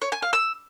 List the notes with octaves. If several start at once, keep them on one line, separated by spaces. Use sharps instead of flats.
C#5
G#5
F5
E6